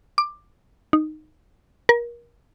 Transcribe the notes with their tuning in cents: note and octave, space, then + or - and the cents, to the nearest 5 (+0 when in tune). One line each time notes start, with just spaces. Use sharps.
D6 +15
D#4 -10
A#4 +30